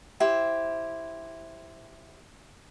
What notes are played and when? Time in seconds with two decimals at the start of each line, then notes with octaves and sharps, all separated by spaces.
0.20 E4 G4 C5